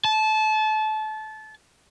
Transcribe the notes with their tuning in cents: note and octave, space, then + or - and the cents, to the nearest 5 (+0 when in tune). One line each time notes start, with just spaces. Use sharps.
A5 -25